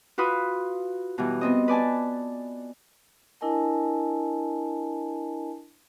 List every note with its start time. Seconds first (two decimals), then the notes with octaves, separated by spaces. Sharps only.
0.18 F4 F#4 B4 B5 D#6
1.18 B2 E3 F#3 G3
1.41 B3 C4 D#5
1.68 B4 D5 G#5 A5
3.41 D4 E4 A#4 D#5 G#5 A5